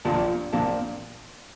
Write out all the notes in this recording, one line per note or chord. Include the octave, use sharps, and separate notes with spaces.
A#1 A#2 F3 A#3 D4 A5
A#1 A#2 F3 A#3 D4 A5